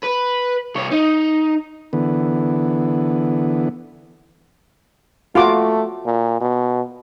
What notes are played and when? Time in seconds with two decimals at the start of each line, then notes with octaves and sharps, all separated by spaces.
0.04 B4
0.76 C2 C#5
0.91 D#4
1.93 D3 E3 B3
5.35 A3 F4 F#4 D6
6.06 A#2
6.40 B2